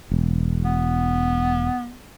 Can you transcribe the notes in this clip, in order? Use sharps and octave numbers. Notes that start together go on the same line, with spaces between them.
E1
B3